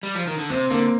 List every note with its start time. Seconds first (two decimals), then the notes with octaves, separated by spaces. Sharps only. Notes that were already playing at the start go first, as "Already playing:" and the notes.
0.03 G3
0.15 F3
0.27 D#3
0.38 D3
0.50 C3 C4
0.70 D3 A#3